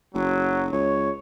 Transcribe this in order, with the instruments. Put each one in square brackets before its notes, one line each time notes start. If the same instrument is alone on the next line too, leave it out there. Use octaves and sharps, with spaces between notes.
[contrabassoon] F#1 [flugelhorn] F#3
[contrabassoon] C#2 [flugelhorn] C#5